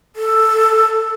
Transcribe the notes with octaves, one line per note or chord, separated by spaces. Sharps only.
A4